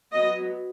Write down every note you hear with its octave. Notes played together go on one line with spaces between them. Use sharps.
F#3 B3 D#5